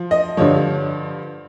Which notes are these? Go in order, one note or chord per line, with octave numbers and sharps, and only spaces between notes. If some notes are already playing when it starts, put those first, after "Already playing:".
Already playing: F3
D#5
G2 D3 F3 C#5